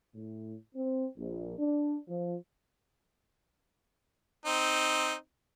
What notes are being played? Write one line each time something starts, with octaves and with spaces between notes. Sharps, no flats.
A2
C4
A#1
D4
F3
C4 D#4